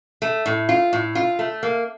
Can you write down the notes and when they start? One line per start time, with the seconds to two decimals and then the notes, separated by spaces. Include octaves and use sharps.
0.22 A3
0.46 A2
0.69 F4
0.93 A2
1.15 F4
1.39 A3
1.63 A#3